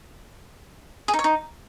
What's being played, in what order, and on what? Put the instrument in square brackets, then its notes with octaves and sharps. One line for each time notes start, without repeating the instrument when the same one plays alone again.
[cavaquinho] G#4
D#4
C#5
D#4